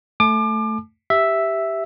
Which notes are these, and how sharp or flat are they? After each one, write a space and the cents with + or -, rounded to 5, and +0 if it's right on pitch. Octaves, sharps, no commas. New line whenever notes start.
A3 +0 A5 -40 D6 +30
G4 +0 E5 +0